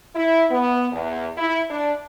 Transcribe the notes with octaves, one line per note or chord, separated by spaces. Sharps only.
E4
B3
E2
E4
D4